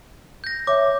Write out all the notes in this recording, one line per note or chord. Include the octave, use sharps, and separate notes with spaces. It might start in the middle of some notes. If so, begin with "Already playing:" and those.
G6 A#6
C#5 E5 D6